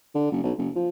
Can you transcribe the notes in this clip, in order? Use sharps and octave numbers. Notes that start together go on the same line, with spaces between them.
D3
F#1
B1
F#1
F3